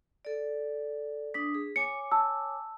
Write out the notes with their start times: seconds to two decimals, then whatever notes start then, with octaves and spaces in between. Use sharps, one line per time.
0.25 A4 D5
1.34 D4 D#6 B6
1.55 G#4
1.76 C#5 G#5 D6 C#7
2.12 A5 E6